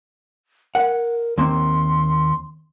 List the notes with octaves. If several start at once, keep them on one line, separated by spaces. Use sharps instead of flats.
A#4 F#5
D#2 A#3 C4 C6